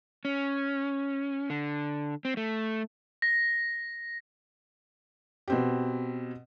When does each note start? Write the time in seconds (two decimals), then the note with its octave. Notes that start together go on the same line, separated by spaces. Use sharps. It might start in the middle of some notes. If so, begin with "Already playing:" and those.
0.25 C#4
1.50 D3
2.25 C4
2.37 A3
3.22 A#6
5.48 B2 C4 G4